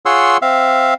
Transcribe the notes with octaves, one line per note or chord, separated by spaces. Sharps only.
F4 G#4 C#5 F#5 C6 E6
C4 E5 F5